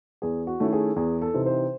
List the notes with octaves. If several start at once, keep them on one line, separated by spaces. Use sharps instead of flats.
E2 G#4
F#4
D#3 A3 C#4 E4
G#4
E2 G#4
A4
C3 E3 C4 D#4
C5